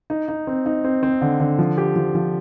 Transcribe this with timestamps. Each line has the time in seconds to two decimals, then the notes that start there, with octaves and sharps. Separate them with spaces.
0.10 D#4
0.28 D#4
0.47 C4
0.66 D#4
0.84 C4
1.03 C4
1.22 D3
1.40 D3
1.59 F3
1.78 G4
1.96 F3
2.15 F3